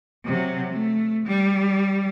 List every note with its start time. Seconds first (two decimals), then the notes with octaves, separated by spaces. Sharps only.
0.25 C3 F#3
0.72 A3
1.26 G3